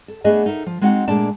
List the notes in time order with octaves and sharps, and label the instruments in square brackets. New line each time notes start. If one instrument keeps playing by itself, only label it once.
[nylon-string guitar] A4
A3 B3 D4 G#4 B4 D#5
D#4 A4 A#4 E5
F3
G#3 C4 D#4 F#4 F#5
A#2 G#3 A3 D4 D5 A5